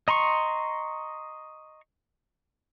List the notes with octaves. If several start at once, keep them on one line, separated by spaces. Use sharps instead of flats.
D#5 A#5 C6 C#6